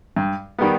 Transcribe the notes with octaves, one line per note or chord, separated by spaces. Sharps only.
G2
D#3 G3 B3